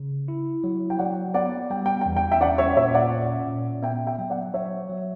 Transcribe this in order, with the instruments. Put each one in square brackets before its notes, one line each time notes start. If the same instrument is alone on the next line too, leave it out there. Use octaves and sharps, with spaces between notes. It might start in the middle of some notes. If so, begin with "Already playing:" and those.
Already playing: [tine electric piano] C#3
E4
F#3
[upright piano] G5
[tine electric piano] F#3 [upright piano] D5 F#5
[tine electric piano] B3 [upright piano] D5 F#5
[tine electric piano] G3 [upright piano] G5
[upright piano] G5
G5
[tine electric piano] E2
[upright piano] G5
E5 G5
[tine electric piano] C#4 [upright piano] D5 F#5
[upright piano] C#5 E5
[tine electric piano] A#2 [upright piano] C#5 E5
[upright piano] D5 F#5
[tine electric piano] C#4
A#2
[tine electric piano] B3 [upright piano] E5 G5
[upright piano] E5 G5
[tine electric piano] F#3
[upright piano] D5 F#5
[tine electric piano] F#3 [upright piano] C#5 E5
[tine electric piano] F#3